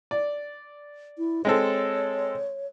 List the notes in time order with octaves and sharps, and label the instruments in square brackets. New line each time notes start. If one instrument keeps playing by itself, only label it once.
[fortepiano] D5
[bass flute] E4
[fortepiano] G#3 C4 A4 [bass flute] C#5